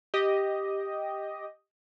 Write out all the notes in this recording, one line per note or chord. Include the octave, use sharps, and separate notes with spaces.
G4 D#5